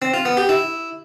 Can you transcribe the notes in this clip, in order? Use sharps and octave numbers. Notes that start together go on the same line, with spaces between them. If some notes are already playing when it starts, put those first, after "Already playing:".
C4
F4
B3
G4
E4